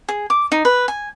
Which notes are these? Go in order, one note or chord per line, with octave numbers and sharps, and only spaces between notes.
G#4
D6
D#4
B4
G#5